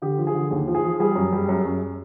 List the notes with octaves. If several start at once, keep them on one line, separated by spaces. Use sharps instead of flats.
D3 G4
F3
G#4
D3
D#2
F3
G#4
F3
G3 G#4
F#2
G3
F#2
F#2